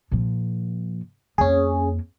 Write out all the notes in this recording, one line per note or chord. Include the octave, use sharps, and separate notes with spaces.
A#2 F3
F2 A#3 C#4 G#4